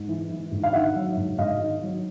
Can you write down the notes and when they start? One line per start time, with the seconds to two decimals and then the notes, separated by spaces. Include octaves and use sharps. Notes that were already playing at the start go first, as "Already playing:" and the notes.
Already playing: G#2
0.08 E3
0.30 E3
0.52 G#2
0.63 F5
0.73 D#3 E5 F#5
0.95 F#3
1.17 G#2
1.38 G#2 D#5 F5
1.60 D#3
1.82 F#3